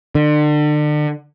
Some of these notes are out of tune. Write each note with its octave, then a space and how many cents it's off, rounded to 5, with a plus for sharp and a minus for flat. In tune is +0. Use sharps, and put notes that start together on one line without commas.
D3 +35